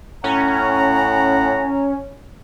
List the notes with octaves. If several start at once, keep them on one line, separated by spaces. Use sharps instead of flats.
A2 C#4 F#5 A#5